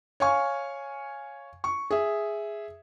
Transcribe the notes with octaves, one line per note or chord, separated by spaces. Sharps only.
C#5 F5 G#5 C#6
C#6
G#4 E5